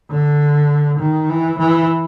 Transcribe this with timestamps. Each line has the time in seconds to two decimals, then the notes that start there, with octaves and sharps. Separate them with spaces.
0.11 D3
1.00 D#3
1.30 E3
1.59 E3